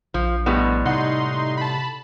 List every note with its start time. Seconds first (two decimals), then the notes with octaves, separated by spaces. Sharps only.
0.14 A#1 F3
0.46 A2 G3 G#3 B3
0.85 C3 D#4 F#5 C6
1.57 A5 B5